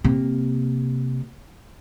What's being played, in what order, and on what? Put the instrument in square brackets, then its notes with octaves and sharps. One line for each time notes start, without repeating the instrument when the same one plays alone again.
[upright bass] C3 A#3